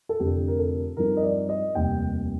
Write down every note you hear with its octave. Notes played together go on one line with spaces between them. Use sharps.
A4
F1 F2 D3 G4
A#4
A4
G2 F3 C4 D#4 A#4
D#5
D5
D#5
F1 D#2 D#3 G3 G5